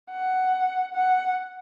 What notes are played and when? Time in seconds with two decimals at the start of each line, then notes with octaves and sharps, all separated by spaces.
0.11 F#5
0.94 F#5